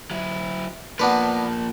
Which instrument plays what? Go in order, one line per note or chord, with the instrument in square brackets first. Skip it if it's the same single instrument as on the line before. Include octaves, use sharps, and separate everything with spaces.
[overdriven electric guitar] F#3 E4
[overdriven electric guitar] F3 A#3 [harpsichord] B3 D4 B4